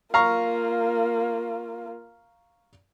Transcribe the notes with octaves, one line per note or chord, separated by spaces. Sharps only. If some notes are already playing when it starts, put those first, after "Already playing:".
A#3 F4 F5 A#5 C#6